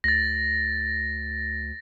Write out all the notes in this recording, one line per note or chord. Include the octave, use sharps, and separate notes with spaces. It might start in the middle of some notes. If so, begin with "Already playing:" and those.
D2 A6 A#6